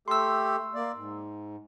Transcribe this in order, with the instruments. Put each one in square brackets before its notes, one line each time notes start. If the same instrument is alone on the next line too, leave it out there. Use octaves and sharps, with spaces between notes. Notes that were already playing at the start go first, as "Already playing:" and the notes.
[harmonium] A3 G4 A4 [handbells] C6 E6
[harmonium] A#3 D5
G#2